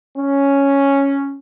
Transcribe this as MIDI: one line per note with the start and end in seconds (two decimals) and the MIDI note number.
0.17 1.37 61